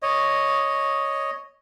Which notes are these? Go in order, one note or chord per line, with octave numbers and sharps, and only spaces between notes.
C#5 D#5